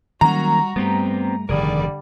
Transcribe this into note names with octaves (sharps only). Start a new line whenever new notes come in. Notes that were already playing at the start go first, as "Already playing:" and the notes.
D#3 F#3 G3 A#3 C#4 F#4 A#5
G2 G3 A3 B3 C4 G4
F1 G2 D3 D#3 G3 G#4 A#4 D5